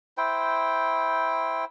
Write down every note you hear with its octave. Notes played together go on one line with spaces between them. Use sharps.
E4 C5 G5